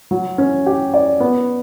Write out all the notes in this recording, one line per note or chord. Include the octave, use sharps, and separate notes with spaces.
F#3
C#4
G4
D5
B3